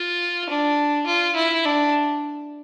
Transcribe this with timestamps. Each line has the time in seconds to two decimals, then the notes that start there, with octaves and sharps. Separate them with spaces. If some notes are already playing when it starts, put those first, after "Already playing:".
Already playing: F4
0.50 D4
1.06 F4
1.36 E4
1.65 D4